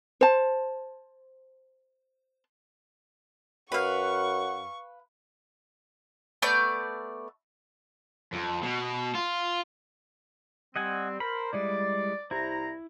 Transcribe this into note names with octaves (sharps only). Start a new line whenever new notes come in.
C5 A5
F#2 B4 F5 F#5 C#6
A3 B3 D5 G6
F2
B2
F4
G3 C4 D#5 F#5 G#5
A#4 C5 B5
G3 G#3 E4 D5
C2 E4 C5 A#5